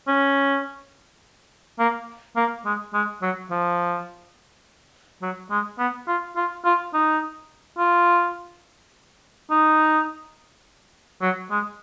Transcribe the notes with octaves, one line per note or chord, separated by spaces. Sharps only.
C#4
A#3
A#3
G#3
G#3
F#3
F3
F#3
G#3
B3
F4
F4
F4
D#4
F4
D#4
F#3
G#3